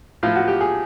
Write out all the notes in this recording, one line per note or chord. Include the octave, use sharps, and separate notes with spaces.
A2 F3 F4
F#4
G4
G#4